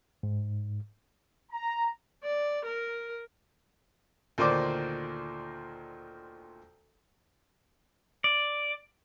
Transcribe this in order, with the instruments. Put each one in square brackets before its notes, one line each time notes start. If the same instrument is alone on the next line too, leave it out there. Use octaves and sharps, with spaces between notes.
[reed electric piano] G#2
[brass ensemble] A#5
[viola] D5
A#4
[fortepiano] D2 A#2 D#3 C5 D5 D6
[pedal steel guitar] D5